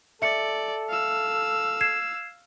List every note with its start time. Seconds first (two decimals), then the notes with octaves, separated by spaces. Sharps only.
0.22 A4 D5 E5 C#7
0.89 F5 E6
1.81 G#6 C7 E7